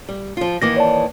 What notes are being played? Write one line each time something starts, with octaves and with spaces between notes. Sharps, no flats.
G3
F3 F4
D#3 E3 A#3 D6 A#6
C#5 D5 A5